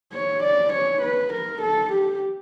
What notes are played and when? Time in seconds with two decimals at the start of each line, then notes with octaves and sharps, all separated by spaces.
0.13 C#5
0.43 D5
0.73 C#5
1.02 B4
1.33 A#4
1.62 A4
1.93 G4